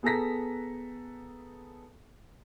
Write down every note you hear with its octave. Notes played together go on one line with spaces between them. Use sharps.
B3 G#4 A4 A#5 A#6 B6